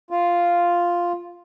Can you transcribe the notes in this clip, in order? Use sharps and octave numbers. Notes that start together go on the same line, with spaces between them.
F4